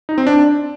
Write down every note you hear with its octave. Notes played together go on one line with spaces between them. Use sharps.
D#4
C4
D4